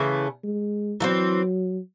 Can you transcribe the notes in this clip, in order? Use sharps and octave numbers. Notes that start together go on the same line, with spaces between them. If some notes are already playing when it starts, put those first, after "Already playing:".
Already playing: C#3 E3 A3
G#3
E3 F#3 A3 C4